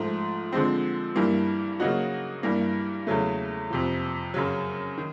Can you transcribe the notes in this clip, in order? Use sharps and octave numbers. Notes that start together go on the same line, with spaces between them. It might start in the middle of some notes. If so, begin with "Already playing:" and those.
Already playing: G#2 F3 A3
D3 F3 G#3 C4
G2 E3 G3 A#3
C#3 F#3 A#3 D#4 F#4
G2 E3 G3 A#3
E2 C#3 F#3 A3
F2 C3 F3
F#2 C#3 F#3
D#3